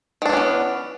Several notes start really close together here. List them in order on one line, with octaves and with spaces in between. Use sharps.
D#3 D4 E3 C#4 B3